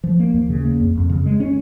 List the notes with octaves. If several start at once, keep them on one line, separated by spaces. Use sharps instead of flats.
F3
A#3
D#2
C#3
A#3
F2
F2
C#3
G#3
C#4